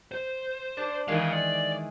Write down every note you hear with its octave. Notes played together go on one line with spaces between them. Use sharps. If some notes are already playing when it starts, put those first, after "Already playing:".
C5
D4 D5 A5
D#3 E3 G#3 F5 G#5
D5